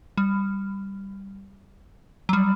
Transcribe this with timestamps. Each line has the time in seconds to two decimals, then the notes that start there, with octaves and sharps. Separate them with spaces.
0.18 G3
2.29 F#3
2.33 G3